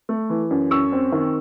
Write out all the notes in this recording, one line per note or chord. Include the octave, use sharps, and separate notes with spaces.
A3
E3
F#2
F#2 C#6 E6
C4
D#3